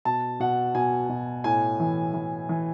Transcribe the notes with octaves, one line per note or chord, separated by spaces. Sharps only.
B2 A5
B2 F#5
B2 G#5
B2
A2 G#5
E3
E3
E3